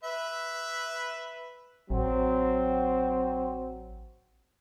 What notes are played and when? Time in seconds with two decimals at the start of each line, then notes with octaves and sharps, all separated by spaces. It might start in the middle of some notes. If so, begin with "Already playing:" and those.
0.03 B4 E5
1.90 A1 F#3 C4